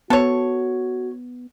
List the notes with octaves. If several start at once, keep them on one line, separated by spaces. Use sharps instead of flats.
B3 F#4 A4 C#5